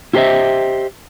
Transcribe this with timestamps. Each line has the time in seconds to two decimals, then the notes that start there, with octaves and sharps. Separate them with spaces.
0.13 E4 F4 G4 C5 D#5 E5